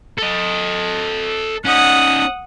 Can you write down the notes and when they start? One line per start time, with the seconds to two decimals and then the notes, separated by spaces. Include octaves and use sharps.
0.18 A4 D#5
1.65 C#4 D#4 F#5 D#6